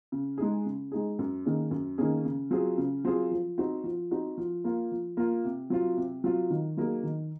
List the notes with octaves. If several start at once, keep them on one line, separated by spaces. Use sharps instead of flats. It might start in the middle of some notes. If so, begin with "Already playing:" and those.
C#3
G#3 D#4 G#4
C#3
G#3 D#4 G#4
F#2
D#3 A#3 C#4 G#4
F#2
D#3 A#3 C#4 G#4
C#3
F#3 C4 F4 G#4
C#3
F#3 C4 F4 G#4
F3
C4 D#4 F#4
F3
C4 D#4 F#4
F3
A#3 F4
F3
A#3 F4
C3
F#3 C4 F4
C3
F#3 C4 F4
D#3
F#3 A#3 D#4 G#4
D#3